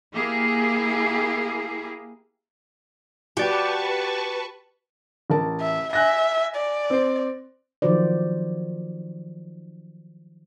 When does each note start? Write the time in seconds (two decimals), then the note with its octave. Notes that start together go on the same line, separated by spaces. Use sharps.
0.12 A#3 E4 G4 G#4
3.37 F#4 G4 B4 D5 G5 A5 C#6
5.30 A1 A#4 A5
5.61 E5
5.93 E5 G#5 F#6 A#6
6.56 D5
6.90 C4 C5
7.82 D#3 F3 F#3 F#4 C5 D5